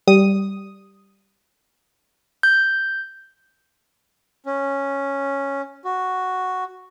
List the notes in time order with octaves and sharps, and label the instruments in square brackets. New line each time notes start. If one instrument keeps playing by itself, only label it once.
[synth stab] G3 D#6
[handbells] G6
[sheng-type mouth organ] C#4
F#4